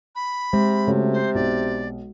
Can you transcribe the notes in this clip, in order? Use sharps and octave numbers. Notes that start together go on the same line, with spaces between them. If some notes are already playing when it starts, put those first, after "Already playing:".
B5
C3 G#3
C#3 A3 F#4
C5
B1 D5